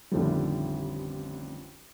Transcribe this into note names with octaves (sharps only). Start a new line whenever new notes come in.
A1 F2 D3 D#3 F3 G3